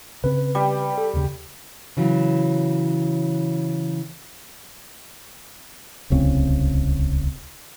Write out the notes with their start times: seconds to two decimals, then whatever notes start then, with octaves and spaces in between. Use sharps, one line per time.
0.24 C#3 C4 B4
0.55 G3
0.98 A4
1.14 D#2 C#3
1.97 C#3 E3 F#3
6.10 D1 C2 C#3 C4